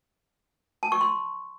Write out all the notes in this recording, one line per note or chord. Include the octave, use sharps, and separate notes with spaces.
A5
C#6
C6